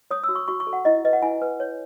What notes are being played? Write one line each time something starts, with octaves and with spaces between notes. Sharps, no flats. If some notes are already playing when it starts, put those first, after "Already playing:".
C#5 D#6
E6
F#4
C#6
F#4 C#6
C#6
A4
F#5
E4 D#5
B4 D#5
F#5
E4 G#5
B4
C#5